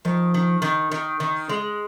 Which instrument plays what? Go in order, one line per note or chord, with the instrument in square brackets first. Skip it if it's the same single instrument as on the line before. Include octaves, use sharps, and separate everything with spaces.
[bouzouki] D#3 [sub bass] F3
[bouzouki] D#3
D#3
D#3
D#3
G#3